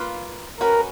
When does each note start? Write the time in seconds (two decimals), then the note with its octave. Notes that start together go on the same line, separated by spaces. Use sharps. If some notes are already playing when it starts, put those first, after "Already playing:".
Already playing: A#3 F4 B4
0.60 C#4 F#4 A#4 B4